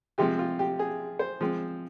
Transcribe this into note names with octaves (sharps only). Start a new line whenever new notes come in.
C3 F3 G#3 C4 G4
F4
G4
G#4
C5
F3 G#3 C4